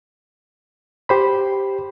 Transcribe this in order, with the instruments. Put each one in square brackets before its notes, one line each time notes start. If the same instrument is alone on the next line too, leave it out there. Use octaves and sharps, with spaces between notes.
[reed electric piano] G4 C5 B5